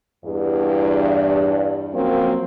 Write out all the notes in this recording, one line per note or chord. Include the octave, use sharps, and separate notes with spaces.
E2 G2
F3 F#3 A#3 C4 C#4